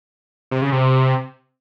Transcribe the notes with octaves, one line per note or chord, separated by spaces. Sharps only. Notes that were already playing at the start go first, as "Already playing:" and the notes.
C3
C#3
C3